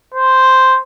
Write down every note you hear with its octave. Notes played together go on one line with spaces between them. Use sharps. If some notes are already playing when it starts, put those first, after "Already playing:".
C5